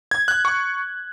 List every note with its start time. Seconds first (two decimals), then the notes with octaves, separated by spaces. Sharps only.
0.11 G#6
0.28 F#6
0.45 C#6